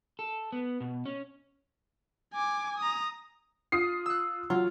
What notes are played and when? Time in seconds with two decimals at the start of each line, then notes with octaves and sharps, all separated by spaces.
0.19 A4
0.53 B3
0.81 B2
1.06 C#4
2.34 G#5 D6
2.78 A#5 D#6
3.72 F4 D#6 C7
4.06 E6 F#6
4.50 F#3 F4